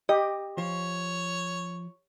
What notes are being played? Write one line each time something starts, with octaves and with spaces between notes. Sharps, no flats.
G4 D#5
F3 C#5